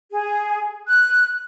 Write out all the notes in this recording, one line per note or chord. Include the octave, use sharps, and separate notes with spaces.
G#4
F#6